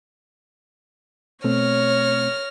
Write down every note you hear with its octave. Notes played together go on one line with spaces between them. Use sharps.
B2 A3 C4 C#5 F6 A#6